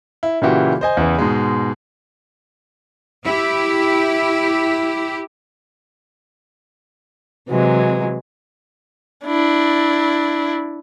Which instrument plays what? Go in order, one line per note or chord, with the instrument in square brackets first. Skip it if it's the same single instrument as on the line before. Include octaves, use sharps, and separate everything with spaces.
[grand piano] E4
A#2 C#3 E3 E4 F#4 G4
C5 D#5 G#5
E2 C#3 E3
G#2 B2 G#3
[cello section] E4 G4
[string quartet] C3 E3 F#3 G#3
[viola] D4 E4